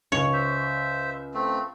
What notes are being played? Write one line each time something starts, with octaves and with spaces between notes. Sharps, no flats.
C#2 C#5
C5 E5
A3 C4